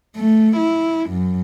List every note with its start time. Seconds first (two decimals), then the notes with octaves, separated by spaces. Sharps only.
0.16 A3
0.57 E4
1.10 F#2